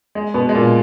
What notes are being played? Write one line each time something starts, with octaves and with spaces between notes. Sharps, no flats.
G#3
B2 B3
G#3
A#2 A#3